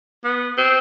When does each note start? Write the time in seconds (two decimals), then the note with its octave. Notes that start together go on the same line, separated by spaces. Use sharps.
0.24 B3
0.58 C4